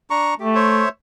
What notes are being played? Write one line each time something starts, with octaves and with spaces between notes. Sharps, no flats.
D4 A#5 C#6
A3 G4
C5 C#5 E5